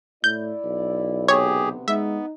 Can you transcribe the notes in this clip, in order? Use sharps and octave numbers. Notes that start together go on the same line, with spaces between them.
A2 E4 D5 G6
B1
D2 C3 B3 G4 G#4 C#5
G#3 B3 D#4 E5